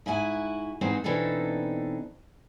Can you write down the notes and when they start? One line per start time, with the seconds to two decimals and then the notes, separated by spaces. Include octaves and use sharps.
0.06 G#2 E4 F#4 G#5
0.81 G#2 E3 C4 D#4 C5
1.04 B2 E3 C4 D4 D#4 A4